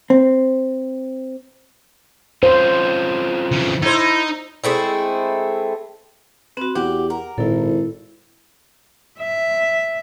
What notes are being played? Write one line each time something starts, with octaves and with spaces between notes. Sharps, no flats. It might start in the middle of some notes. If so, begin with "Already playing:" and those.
C4
C4 C#4 F4 C5
C#3 E3
D#4 E4 C5
G#3 A3 C4 E4
C4 F#4 B4
E2 G4 F#5
A#4
G#1 A#2 E4 A4
E5